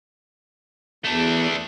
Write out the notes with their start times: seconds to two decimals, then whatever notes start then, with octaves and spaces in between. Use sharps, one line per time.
1.04 E2 A3 D4